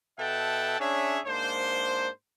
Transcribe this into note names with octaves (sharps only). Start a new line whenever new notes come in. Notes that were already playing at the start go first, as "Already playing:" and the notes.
B2 A4 E5 F#5 G5 A5
C#4 D4 G#4 C#5 E5
G#2 A#3 D4 C5